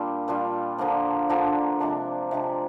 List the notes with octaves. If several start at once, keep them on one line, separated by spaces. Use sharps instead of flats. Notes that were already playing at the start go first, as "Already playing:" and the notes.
Already playing: A#2 G3 A#3 D4 F4
A#2 G3 D4 F4
D3 F3 A#3 D4
D3 F3 A#3 D4
C3 F3 G#3 D4
C3 F3 G#3 D4